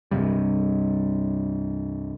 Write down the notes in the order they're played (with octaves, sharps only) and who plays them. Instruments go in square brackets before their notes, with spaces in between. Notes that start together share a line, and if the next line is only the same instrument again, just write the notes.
[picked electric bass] C2 G2 C3 G3